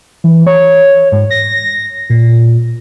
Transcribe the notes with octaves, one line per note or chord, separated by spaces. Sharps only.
E3
C#5
G#2
A#6
A#2